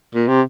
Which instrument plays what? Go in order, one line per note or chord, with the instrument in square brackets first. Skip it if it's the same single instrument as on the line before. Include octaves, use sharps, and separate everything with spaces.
[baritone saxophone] A#2
C3